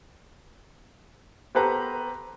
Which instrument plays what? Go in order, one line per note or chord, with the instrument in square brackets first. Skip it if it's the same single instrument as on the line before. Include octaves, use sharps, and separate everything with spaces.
[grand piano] B3 G4 A4 B4 C5 A#5